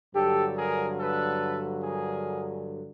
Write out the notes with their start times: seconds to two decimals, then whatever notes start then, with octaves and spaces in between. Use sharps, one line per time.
0.14 G2 D3 F#3 G4 A4
0.56 G#4 A#4
0.98 A4 B4
1.82 G#4 A#4